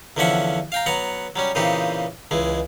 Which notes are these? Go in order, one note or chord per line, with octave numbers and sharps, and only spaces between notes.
E2 D3 F3 C#4 E5 F#5
F5 G5 A#5
F#3 B3 F#5 A#5
F#3 G3 C#4
A#2 C#3 E3 C4 D#4 G4
C#2 E3 G#3